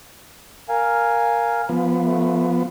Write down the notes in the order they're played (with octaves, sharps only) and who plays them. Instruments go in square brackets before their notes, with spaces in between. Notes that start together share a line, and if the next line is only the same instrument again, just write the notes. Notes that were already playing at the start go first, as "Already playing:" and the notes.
[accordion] A#4 F5 G#5
[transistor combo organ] F3 B3
[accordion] A3